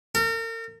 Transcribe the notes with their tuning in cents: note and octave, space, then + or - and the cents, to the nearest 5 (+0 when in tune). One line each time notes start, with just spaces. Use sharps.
A#4 -40